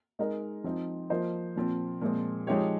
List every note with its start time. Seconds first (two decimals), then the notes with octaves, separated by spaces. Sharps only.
0.19 G#3 D#4 A#4 D#5
0.64 F3 C4 D#4
1.10 F3 A#3 F4 C5 D#5
1.56 A#2 F3 C4
2.01 A#2 F3 G#3 C4
2.47 F3 G#3 D#4 G4 C#5